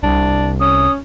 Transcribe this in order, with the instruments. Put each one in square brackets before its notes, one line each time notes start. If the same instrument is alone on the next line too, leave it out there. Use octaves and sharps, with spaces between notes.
[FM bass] C2 [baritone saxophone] D4
[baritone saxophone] C#4 [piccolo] D#6